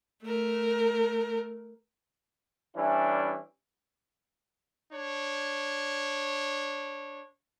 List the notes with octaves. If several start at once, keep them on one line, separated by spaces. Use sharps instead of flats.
A3 A#4
E3 G3 C#4 D4 E4
D4 C#5